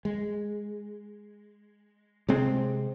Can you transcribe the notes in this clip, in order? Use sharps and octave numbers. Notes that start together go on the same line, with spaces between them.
G#3
C3 G#3 C4